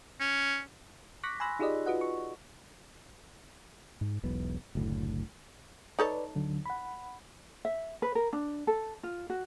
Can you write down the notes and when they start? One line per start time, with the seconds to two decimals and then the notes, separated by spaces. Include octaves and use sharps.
0.21 C#4
1.23 C#6 D6 F#6 A#6 B6
1.40 G#5 B5 C6 E6 F#6 A#6
1.59 D#4 F4 G4 G#4 D5 D#5
1.86 F4 F#4 B4 D#5 F#5
2.01 C#6
4.01 G#2
4.23 E1 B1 B3
4.75 F#1 D2 A2
5.99 D#4 A4 B4 C#5 D5
6.35 D2 D3 F#3
6.66 F#5 B5
7.65 E5
8.02 B4
8.15 A#4
8.33 D4
8.67 A4
9.03 F4
9.30 F#4